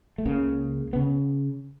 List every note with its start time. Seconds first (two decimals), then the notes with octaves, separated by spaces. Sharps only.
0.18 A3
0.25 C#2 C#3 A#3
0.93 C#3 B3